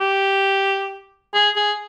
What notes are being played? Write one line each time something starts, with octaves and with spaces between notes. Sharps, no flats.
G4
G#4
G#4